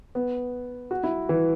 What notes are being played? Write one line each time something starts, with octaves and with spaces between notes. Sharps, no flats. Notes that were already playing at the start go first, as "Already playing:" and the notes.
B3
F#4
E4
E3